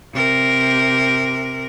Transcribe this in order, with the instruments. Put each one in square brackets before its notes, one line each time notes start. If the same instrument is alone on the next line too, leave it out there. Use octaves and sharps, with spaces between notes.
[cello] C3 A#4